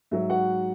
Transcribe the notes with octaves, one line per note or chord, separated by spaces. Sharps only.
G#2 F#3 E5
F#4 F#5